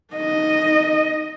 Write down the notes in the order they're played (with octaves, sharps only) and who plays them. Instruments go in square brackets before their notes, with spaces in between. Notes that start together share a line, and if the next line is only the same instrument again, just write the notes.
[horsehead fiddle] D#4 D#5